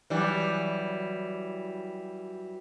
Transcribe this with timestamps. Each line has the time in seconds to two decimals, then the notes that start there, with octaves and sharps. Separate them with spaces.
0.10 E3 F#3 G3